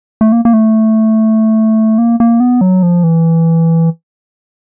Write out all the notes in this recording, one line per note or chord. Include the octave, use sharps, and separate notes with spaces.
A3
A#3
A#3
A3
A#3
A#3
B3
F#3
F3
E3